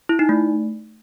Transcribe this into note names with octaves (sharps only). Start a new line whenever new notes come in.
E4
D#4
A3